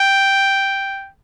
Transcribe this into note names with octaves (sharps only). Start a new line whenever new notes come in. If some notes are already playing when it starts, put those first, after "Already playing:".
Already playing: G5